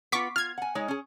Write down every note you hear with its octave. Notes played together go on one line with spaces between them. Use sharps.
B3 F4 C#6 D6 B6
F4 F6 G#6
F#5 G#5
G#3 D#4 C#5
C#4 G#4